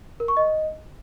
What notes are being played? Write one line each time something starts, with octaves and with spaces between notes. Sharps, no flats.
A#4
C#6
D#5